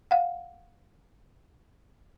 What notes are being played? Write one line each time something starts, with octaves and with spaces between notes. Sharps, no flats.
F5 F#5